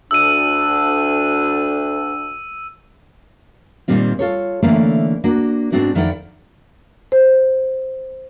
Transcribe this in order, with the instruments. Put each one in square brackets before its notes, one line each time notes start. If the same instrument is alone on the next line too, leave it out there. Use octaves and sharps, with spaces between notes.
[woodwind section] D2 D4 [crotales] E6 D#7
[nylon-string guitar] A#2 D#3 G3 C4 F4
F4 A4 C#5
D3 E3 A3 A#3 C#4
A#3 D4 F#4
G#2 D#3 B3 C4 D4 F#4
F2 D#3 E4 D5 F#5 G5
[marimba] C5